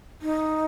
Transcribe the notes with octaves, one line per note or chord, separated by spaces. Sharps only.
D#4